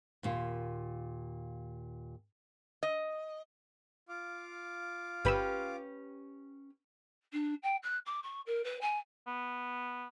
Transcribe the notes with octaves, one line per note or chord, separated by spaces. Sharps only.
D#2 A#2 F4
D#5
F4 F5 D6
G1 C#4 G4 B4 B5 E6
D4
G5
F#6
D6
C#6
A#4
B4
G#5
B3